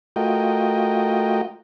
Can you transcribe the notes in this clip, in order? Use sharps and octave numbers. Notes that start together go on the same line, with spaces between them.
A3 F4 F#4 A#4 D#5 G5